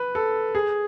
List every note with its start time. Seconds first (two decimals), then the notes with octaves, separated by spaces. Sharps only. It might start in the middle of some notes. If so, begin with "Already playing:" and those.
Already playing: B4
0.15 A4
0.55 G#4